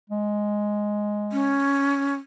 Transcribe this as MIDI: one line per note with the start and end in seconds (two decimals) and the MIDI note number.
0.10 1.68 56
1.32 2.14 61